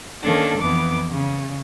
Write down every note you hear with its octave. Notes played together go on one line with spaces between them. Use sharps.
D#3 A#3 C#4 D4 A4
F2 E3 B3 D6
C#3